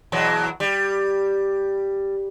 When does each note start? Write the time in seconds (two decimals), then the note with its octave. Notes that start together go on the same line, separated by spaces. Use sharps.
0.12 E2 B2 F#3
0.60 G3